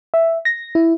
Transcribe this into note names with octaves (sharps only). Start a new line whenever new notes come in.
E5
A#6
E4